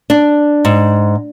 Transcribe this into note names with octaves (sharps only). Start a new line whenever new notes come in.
D4
G#2